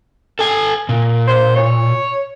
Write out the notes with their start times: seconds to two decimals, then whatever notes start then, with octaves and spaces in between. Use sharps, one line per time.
0.39 A4 G#5
0.89 A#2
1.28 C5
1.56 C#5